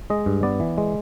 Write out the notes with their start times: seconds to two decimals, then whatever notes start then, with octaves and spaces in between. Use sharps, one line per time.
0.10 G#3 D#5
0.26 G2
0.43 B3 D5
0.60 E3
0.78 G#3